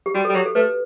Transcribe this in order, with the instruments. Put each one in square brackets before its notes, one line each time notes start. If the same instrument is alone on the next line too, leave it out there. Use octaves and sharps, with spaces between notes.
[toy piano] G4
[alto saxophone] G3 [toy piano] F#4
[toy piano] A4
[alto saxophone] G3
[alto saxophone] F#3 [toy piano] G4
[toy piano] A4
[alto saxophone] A3 [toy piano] B4